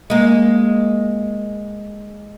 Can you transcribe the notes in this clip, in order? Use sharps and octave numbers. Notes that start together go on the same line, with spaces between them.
G#3 A#3